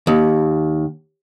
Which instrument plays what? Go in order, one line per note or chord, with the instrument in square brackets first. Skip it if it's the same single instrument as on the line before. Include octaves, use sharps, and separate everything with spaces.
[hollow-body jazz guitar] D#2